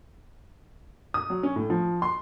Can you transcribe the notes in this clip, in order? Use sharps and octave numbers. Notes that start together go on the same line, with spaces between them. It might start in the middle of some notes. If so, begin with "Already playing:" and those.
D#6
F#3
C#4
A2
F3
C6